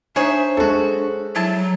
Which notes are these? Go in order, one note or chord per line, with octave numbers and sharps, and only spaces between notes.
D4 D#4 G#4 C5 C#5 E5
F#3 G#3 F#4 A4
F#3 E4 A5